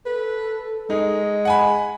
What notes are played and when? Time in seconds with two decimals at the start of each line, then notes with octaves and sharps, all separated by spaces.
0.06 A4 B4
0.90 G#3 D#4
1.45 F#5 G#5 B5